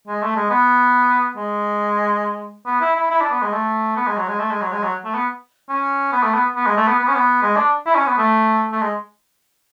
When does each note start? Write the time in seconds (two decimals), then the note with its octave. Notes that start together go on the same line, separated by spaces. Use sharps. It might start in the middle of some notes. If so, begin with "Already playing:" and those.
0.08 G#3
0.22 A3
0.36 G#3
0.50 B3
1.37 G#3
2.66 B3
2.81 E4
2.96 E4
3.11 E4
3.21 D4
3.31 B3
3.42 G#3
3.53 A3
3.96 B3
4.07 G#3
4.17 F#3
4.28 G#3
4.40 A3
4.51 G#3
4.62 F#3
4.72 G#3
4.83 F#3
5.05 A3
5.15 B3
5.69 C#4
6.12 B3
6.23 A3
6.34 B3
6.56 B3
6.67 G#3
6.77 A3
6.88 B3
6.99 B3
7.08 C#4
7.15 B3
7.43 G#3
7.57 D4
7.86 E4
7.96 C#4
8.07 B3
8.18 A3
8.72 A3
8.82 G#3